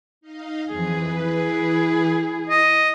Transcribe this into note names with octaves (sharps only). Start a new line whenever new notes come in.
D#4 D#5 F5
F2 E3 G#4 B4
E4 G#4
D#5